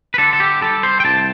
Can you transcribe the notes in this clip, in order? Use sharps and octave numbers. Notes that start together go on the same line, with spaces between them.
B4
D3 A4
A4
G4
G3 A4
C5
G5
C2 A5